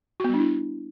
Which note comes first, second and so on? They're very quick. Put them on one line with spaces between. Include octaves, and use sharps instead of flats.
F#4 B3 G3 D4 E4